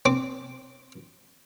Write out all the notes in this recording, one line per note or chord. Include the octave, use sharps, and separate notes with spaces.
C4 D6